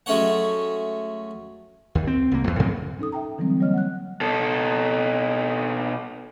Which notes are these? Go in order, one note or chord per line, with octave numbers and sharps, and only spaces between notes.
F#3 G#3 A3 C#4 C#5 F#5
D#2
C4
C2 A#3
E2
A2 C#3 F#3 C4
C#4 D#4 A4 D#6
E5 G5 A#5
D3 E3 F#3 G3 C4
F#3 G3 A#3 C#5 D#5 F6
F#5 F#6
B2 A4